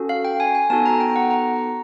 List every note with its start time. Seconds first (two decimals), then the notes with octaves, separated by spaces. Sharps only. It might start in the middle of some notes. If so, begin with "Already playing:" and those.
Already playing: C#4 F#4 A4
0.09 F5
0.25 G5
0.40 G#5
0.55 G#5
0.70 B3 D#4 F#4 A4 A5
0.85 A#5
1.00 G5
1.16 F#5
1.30 A#5
1.46 A#5